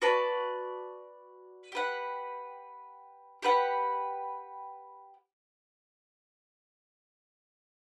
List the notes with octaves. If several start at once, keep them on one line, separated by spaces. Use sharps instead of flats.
F#4 B4 D5 A5
G4 B4 F#5
G4 B4 F#5